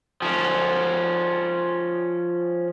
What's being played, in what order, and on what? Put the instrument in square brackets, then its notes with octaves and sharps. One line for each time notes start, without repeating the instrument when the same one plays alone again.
[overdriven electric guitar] F3 C#4